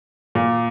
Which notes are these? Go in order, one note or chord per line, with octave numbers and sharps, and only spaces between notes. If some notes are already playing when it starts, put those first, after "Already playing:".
A#2